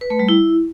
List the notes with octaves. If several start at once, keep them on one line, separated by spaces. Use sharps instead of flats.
B4
A3
G3
E4